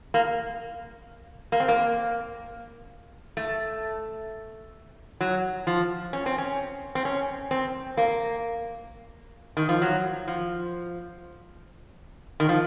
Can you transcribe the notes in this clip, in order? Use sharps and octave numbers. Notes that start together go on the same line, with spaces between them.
A#3
A#3
C4
A#3
A3
F#3
F3
C#4
C4
C#4
C4
C#4
C4
A#3
D#3
F3
F#3
F3
D#3
F3